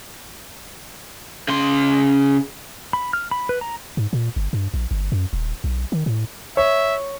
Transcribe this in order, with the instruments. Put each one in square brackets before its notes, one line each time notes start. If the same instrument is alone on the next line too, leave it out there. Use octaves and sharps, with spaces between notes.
[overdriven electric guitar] C#3 C6
[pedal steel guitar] B5
F6
B5
B4
A#5
[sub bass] G#2
A#2
G1
G2
A#1
G1
F#2
D#1
B1
D#3
A2
[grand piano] C#5 [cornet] E5